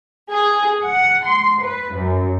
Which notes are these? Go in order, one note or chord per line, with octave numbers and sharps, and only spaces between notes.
G#4
F#5
C6
B4
F#2